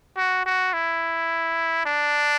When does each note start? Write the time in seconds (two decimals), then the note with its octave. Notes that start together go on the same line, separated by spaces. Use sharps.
0.17 F#4
0.45 F#4
0.73 E4
1.86 D4